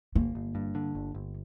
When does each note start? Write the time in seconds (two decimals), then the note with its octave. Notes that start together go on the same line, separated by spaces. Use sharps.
0.15 G1 A#3
0.35 G1
0.55 G2
0.75 D3
0.95 G1
1.15 G1